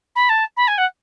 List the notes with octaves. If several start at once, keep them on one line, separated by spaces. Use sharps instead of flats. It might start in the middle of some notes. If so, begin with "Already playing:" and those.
B5
A5
B5
G#5
F#5